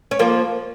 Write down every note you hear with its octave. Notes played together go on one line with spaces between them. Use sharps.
C#4
F3 A#3